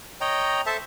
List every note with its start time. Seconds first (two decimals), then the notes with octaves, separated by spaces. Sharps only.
0.21 C#5 D#5 G5 A#5
0.66 A4 C5 E5 A5